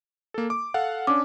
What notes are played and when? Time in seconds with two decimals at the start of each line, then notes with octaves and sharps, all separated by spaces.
0.34 A#3 A4
0.50 D6
0.74 A4 F5 F#5
1.07 C#4 D4 D6